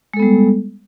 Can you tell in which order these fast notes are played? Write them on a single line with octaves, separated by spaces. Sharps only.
G#3 A4 B3 G3